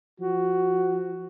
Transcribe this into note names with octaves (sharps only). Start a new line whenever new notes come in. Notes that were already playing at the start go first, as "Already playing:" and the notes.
F3 F#4